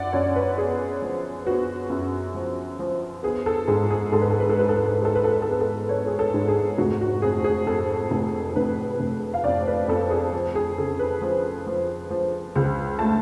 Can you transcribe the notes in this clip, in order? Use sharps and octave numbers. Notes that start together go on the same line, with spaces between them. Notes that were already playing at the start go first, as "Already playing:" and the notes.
Already playing: F#2 D5 F#5
F#2 C#5
B4
B3 G#4
F3
B3 F#4
F#2
F3
F3
B3 G#4
A4
G#2 G#4
G#4
G#2 A4
B4
A4
B4
A4
G#3 B4
A4
B4
A4
B4
G#3 A4
B4
A4
B4
B3 A4
B4
A4
B3 C#5
G#4
A4
G#2
G#4
F1 F#4
F#4
F2 G#4
G#4
F2 A4
F1
F1 B4
F1
F5
F2 D5
B4
F2 A4
G#4
F3
G#4
C#3 A4
B4
F3
F3
F3
C#2
A3 A5